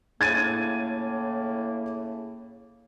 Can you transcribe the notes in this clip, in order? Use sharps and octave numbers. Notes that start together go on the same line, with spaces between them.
A2 C#3 A#3 G#6 A6 D#7